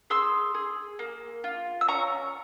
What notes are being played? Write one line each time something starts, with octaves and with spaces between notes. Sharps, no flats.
G#4 C6 E6
G#4
A#3
F4
E6
C#4 A#5 C#6